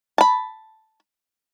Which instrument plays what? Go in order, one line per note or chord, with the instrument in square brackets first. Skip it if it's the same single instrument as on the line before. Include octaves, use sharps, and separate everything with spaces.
[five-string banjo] A5 B5